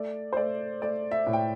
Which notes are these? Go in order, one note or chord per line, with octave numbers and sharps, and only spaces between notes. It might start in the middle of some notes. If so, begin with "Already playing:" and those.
Already playing: A3 D5
C5
A3 D5
A3 D5
E5
A2
G5